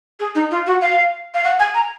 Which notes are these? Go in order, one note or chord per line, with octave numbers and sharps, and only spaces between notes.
G#4
D#4
F4
F#4
F5
F5
F#5
G#5
A#5